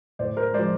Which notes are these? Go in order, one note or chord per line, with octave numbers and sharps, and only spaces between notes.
A2 C5 D5
A#4 C5
F3 G#3 C5 D5